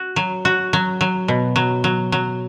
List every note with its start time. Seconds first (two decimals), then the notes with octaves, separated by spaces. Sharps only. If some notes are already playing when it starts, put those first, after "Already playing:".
Already playing: F#4
0.16 F#3
0.45 F#4
0.73 F#3
1.01 F#3
1.28 B2
1.56 F#3
1.84 F#3
2.12 F#3